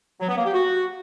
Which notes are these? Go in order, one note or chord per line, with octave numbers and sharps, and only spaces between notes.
F#3
B3
A#3
G4
F#4